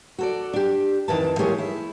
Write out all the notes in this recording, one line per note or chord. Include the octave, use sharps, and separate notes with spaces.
F#4 A4 D5
D4 G4
F2 D#3 E3 A5
E3 G#3 A#3 G4 G#4 C#5
E4